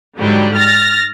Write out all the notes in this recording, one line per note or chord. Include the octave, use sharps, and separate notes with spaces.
G#2 D3 F#3 G3
F6 A6 A#6